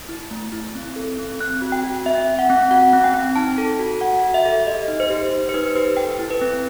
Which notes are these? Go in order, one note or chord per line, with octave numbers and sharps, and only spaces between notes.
E4
A3
E4
C4
A4
C4
C4 F#6
F#4
G5
F#4
C4 E5
C4
F#5
C4
F#4 F#5
C4
G5
C4
D#4 A5
A4
F#4
F#4 F#5
F#4
E5
A4
G4 D#5
D#4
C5
G4
D#4
C5
D#4 B4
G4 B4
A4 G5
E4
B4
C4